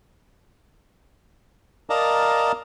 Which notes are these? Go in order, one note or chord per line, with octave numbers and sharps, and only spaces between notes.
A#4 D5 D#5 F5 A5 A#5